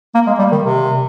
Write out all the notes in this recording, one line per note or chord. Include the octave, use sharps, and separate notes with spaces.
A#3
G#3
G3
D#3
C3